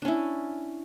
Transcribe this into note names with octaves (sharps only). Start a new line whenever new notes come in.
C#4 D4 E4